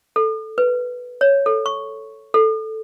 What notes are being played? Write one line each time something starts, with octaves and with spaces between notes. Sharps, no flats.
A4
B4
C#5
A4
C#6
A4